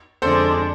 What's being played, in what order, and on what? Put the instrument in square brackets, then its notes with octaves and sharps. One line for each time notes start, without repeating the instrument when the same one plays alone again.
[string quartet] F2 D3 G#3 D4 [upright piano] A4 C5